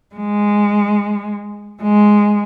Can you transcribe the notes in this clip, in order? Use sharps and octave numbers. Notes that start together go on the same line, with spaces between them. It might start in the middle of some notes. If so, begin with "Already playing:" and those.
G#3
G#3